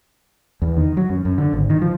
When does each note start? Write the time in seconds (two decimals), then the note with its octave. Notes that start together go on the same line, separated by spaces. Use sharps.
0.62 E2
0.77 D#3
0.97 F#3
1.10 F#2
1.25 F#2
1.38 D3
1.53 G#1
1.70 D#3
1.82 F3